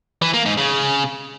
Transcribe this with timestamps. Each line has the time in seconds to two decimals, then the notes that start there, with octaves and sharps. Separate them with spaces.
0.22 E3
0.34 A#3
0.45 G#2
0.57 C#3